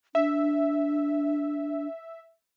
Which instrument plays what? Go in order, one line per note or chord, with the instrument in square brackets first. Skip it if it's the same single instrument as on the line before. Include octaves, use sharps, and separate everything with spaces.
[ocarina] D4 [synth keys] E5